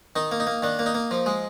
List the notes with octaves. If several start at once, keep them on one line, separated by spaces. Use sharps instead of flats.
D#3 D#4
A#3
D#4
A#3
D#3 D4
A#3
D#4
A#3
F3
G#3